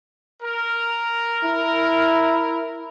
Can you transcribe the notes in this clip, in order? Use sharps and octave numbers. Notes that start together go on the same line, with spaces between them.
A#4
E4